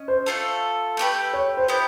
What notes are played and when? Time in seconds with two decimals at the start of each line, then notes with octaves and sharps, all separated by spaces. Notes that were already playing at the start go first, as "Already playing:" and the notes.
Already playing: C#4 D#5
0.08 C5
0.26 A3 D4 F4 A4
0.97 A3 D4 G4 B4
1.33 C#5
1.57 C5
1.68 B3 E4 G4